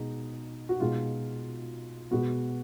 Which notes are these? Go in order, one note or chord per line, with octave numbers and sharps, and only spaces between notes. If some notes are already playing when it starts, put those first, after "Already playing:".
Already playing: B2 G#3 D#4
F#4
B2 G#3 D#4 F4
B2 G#3 B3 F#4